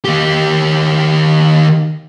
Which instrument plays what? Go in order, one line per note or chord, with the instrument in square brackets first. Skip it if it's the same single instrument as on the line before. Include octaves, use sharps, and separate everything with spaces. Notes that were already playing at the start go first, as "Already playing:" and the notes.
[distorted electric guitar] D#3 G4